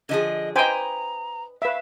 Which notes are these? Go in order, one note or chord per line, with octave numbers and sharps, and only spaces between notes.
D3 F3 G#4 D#5
B4 C5 D#5 G5 G#5 A#5
B4 E5 F5